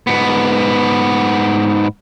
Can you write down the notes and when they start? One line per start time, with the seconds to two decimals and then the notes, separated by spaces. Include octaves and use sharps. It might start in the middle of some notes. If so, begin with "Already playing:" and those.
0.07 G#2 B3